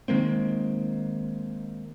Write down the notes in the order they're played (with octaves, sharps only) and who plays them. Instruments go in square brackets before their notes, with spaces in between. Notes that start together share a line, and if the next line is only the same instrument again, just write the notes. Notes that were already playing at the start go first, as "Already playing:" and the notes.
[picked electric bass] D#3 G#3 A#3 C4